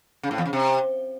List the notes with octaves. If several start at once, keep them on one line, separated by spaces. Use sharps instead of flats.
C#3
A2
E2
C#3
C3